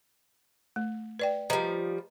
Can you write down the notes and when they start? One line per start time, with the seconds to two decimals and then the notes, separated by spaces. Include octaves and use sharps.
0.76 A3
1.19 B4 D5 G5
1.50 F3 G3 B4 D#5 A#5